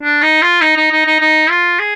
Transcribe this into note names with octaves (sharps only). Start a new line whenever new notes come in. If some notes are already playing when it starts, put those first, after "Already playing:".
D4
D#4
F4
D#4
D#4
D#4
D#4
D#4
F4
G#4